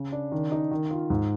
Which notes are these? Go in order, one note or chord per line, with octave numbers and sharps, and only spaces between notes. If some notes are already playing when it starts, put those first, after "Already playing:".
Already playing: C#3
D4
D#3
D#4
D#3
F4
G#2